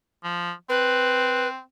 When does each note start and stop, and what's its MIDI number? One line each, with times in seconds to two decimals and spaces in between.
0.24 0.52 53
0.69 1.61 60
0.69 1.48 71